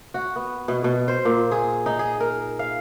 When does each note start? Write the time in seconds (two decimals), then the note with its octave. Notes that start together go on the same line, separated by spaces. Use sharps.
0.14 F#4
0.36 B3
0.68 B2
0.84 B2
1.08 C5
1.25 A#2
1.51 G#4
1.86 D#4
1.99 G#4
2.20 A#4
2.59 F5